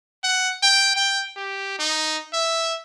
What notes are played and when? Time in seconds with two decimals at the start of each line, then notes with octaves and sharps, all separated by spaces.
0.24 F#5
0.63 G5
0.96 G5
1.37 G4
1.79 D#4
2.34 E5